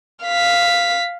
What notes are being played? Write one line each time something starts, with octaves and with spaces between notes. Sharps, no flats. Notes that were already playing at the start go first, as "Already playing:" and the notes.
F5 B6